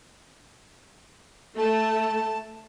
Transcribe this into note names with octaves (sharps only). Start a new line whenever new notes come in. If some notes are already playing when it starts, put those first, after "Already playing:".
A3 A5